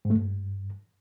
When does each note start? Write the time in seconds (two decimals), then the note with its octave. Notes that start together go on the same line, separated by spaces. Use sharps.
0.05 G#2
0.10 A3
0.15 G2